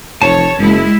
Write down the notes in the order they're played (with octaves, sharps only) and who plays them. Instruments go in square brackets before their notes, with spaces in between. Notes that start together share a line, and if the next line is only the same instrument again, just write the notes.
[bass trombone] F1 [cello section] C#5 [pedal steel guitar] A5
[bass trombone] F#1 [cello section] G#3 E4